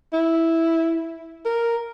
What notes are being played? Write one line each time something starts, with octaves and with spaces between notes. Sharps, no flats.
E4
A#4